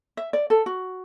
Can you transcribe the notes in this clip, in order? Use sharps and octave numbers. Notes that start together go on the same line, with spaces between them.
E5
D5
A4
F#4